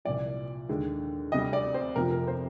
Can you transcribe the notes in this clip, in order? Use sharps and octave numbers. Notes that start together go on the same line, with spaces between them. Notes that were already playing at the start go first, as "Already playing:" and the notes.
C2 A#2 F3 D5
D#2 D3 G#3
D2 C3 G3 D#5
D5
C5
F1 F2 C3 F3 A#4
A#4
C5